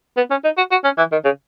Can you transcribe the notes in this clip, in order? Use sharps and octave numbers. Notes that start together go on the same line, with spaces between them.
B3
C#4
D#4
F#4
F#4
C#4
E3
D#3
C#3